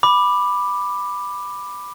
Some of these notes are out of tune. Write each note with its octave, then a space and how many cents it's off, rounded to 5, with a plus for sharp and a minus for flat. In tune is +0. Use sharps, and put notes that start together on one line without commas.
B5 +0 D6 +10